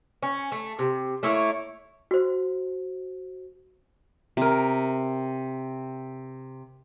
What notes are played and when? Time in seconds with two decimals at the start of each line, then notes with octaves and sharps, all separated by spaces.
0.23 C#4
0.52 A3
0.79 C3
1.23 A3 A#3 E4 C#5
2.11 F#4 C5
4.37 C3 A#4